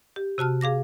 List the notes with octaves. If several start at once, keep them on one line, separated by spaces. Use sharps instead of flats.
G4
C3 F#4 A5 F6
G#4 F5 D6 A#6